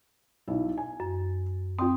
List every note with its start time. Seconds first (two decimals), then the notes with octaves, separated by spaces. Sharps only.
0.47 B1 E4
0.78 G#5
1.00 F#2
1.79 C4 F4 G5 D#6